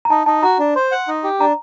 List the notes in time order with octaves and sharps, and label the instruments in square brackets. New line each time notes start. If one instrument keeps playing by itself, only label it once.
[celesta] A#5
[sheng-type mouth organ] D#4 [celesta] A5
[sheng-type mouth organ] D#4 [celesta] A5
[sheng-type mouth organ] F#4 [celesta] A#5
[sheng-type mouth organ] D4
[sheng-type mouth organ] C5 [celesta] C6
[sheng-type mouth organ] F#5
D#4
G4
[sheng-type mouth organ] D4 [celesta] A#5